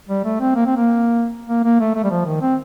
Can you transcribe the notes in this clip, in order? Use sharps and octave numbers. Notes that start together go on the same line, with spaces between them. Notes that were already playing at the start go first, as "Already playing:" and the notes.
G3
A3
C4
A#3
C4
A#3
A#3
A#3
A3
A3
G3
F3
D#3
C4